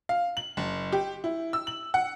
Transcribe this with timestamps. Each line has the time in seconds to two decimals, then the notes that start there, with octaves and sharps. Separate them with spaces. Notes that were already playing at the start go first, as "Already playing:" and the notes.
0.09 F5
0.37 F#7
0.57 F#1
0.92 G4
1.24 E4
1.53 E6
1.67 F#7
1.94 F#5